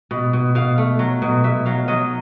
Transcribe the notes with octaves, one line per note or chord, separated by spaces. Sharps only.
B2
B2
B2 F5
A3
F#3
B2
B2 E5
F#3 F5
F#3 D#5